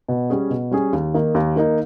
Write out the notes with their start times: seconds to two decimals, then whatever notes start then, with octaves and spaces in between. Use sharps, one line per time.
0.08 B2
0.30 G3 C#4 G#4
0.50 B2
0.71 G3 C#4 G#4
0.93 D#2
1.14 D#3 A#3 D#4
1.35 D#2
1.56 D#3 A#3 D#4